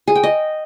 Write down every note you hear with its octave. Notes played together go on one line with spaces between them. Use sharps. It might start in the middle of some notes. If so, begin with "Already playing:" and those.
G#4
G5
D#5